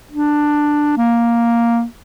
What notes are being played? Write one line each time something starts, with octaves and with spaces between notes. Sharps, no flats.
D4
A#3